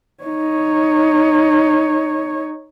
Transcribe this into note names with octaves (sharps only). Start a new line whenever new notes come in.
D#4 C#5